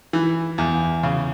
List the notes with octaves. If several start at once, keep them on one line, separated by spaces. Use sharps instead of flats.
E3
E2
C#3